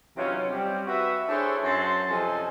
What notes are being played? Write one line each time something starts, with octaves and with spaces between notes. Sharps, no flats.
C3 E3 F#3 C#4 D#4 F4
G3 C4 G4
F#4 B4 E5
D4 E4 G#4 A4 C5 C#5
F#2 C#5 E5 A5 C6
C3 F3 A4 D#5 G#5